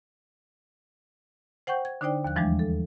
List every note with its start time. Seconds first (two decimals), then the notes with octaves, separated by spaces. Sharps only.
1.67 C5 F#5 G5 C#6 G6
1.85 G#6
2.01 D3 D4 D#4 C5 D5 G5
2.24 D#2 F3 F#6
2.36 E2 E3 F3 G3 G#3 D4
2.59 A4